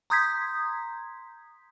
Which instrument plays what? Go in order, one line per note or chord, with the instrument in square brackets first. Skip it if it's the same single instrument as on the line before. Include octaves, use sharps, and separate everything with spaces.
[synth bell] A#5 C6 D#6 G6 G#6 B6